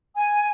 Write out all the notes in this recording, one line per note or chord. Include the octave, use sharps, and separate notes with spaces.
G#5